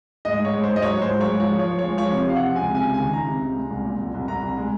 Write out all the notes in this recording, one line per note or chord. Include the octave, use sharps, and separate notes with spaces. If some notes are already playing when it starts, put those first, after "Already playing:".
G#2 D#5
G#2
C#5
G#2
G#2 C5
D#5
F#3 C#5
G#2 C5
F#3
C#5
G#2
F3 C#5
F3 C#5
F3
G#3 C#5
F3 C#5
C3
C3 F5
F3 F#5
C#2 G#5
C3 G#5
C#2
D#3 G#5
C#2 A#5
C3
C#2
G#3
C2
A#2
C2
C2
C2 A#5
C2
G#3